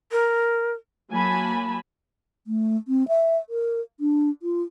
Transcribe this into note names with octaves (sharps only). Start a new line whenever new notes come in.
A#4
F#3 A#3 G#5 A5 B5
A3
C4
E5
A#4
D4
F4